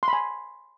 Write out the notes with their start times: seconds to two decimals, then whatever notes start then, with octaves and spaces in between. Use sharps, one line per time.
0.03 C6
0.08 B5
0.13 G#5